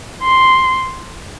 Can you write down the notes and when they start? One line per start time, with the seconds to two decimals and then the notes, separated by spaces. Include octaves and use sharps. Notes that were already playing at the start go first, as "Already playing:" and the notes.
0.23 C6